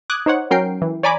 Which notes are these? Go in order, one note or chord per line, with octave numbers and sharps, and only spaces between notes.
D6 D#6 F#6 G#6
D#4 C5 C#5 F#5
F#3 C#4 A#4 G5 C7 D7
E3
C#5 D5 G#5 A#5 B5 D6